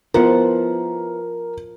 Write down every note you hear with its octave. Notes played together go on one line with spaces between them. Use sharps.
F3 B3 E4 A#4 C5 F#5